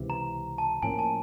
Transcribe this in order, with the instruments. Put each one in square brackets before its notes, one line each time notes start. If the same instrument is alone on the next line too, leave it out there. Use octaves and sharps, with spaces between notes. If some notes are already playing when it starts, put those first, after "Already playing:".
Already playing: [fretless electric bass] C#2 C3 E3
[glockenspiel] A#5
A5
[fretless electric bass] A2 F3 A#3 C#4 [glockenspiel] G#5
[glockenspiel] A5